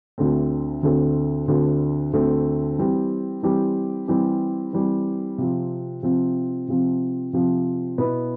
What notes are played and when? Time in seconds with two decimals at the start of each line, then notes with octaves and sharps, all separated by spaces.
0.18 D2 D3 A3 C4
0.83 D2 D3 A3 C4
1.48 D2 D3 A3 C4
2.13 D2 D3 A3 C4
2.78 E3 G3 C4 G4
3.43 E3 G3 C4 G4
4.08 E3 G3 C4 G4
4.73 E3 G3 C4 G4
5.38 C3 F3 C4
6.03 C3 F3 C4
6.68 C3 F3 C4
7.33 C3 F3 C4
7.98 B2 B3 E4